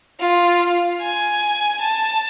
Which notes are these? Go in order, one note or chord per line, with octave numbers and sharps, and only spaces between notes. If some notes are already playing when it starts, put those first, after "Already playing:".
F4
G#5
A5